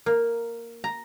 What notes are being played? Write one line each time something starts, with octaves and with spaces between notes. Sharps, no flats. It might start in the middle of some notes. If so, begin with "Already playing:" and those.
A#3
A#5